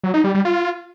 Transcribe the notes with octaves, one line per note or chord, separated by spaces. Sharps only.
F#3
D#4
G3
G3
F4